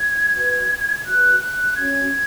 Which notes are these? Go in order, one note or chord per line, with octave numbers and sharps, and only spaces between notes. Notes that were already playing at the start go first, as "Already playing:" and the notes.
Already playing: G#6
F#4 B4
F#4 B4 F#6
F#6
C#4 F#4 C#5 G#6